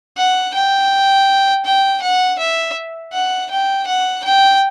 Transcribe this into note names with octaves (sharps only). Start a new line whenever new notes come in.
F#5
G5
G5
F#5
E5
F#5
G5
F#5
G5